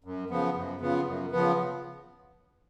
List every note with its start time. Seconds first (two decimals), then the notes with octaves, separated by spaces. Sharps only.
0.04 F#2
0.30 C#3 F3 B3
0.55 F#2
0.81 C#3 F3 B3
1.06 F#2
1.32 C#3 F3 B3